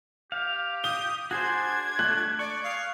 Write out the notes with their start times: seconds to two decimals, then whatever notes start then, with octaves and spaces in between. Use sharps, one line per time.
0.32 G4 F5
0.84 D#6 G7
1.31 D4 F#4 G#4 C5 G#6
1.99 A3 F#6
2.39 D5 C#6
2.64 G#4 F5